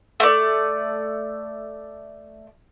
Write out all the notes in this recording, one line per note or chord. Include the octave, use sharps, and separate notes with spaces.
A3 D5